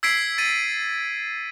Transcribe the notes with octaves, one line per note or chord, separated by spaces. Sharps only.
E6 G#6 B6 C7 D7
A6 D#7